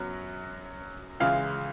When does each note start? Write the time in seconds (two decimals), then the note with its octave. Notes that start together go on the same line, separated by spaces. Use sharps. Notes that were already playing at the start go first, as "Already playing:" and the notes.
Already playing: F#2 F#3 B3
1.20 C#2 C#3 E3 G#3 F5